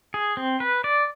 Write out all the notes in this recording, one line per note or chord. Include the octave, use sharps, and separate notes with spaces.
G#4
C4
B4
D5